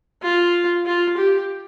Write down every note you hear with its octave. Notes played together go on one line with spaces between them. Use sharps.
F4
F4
G4